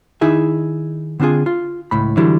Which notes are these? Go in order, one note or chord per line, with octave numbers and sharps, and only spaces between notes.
D#3 D#4 E4 G#4 E5
D3 C4 D4 F4 G#4
F4
C#2 A2 B5
D3 E3 F#3 G3 E4